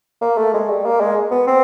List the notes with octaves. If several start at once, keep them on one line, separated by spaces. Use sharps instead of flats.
A#3
A3
G#3
G3
A#3
G#3
B3
C4